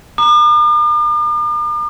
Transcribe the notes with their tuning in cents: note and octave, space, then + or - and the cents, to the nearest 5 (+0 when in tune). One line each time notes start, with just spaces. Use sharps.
A#5 +0 D6 +45